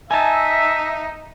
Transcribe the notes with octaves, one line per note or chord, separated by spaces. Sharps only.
D#4 E5 G#5 A5